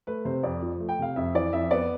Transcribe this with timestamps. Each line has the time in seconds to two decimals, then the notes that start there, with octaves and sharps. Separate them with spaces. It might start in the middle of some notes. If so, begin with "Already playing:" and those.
0.07 A3 B4
0.25 C3 C5
0.43 F2 D5
0.62 F3
0.80 A3
0.89 G5
0.99 C3 F5
1.16 F2 E5
1.35 E3 D5
1.53 F2 E5
1.71 B3 D5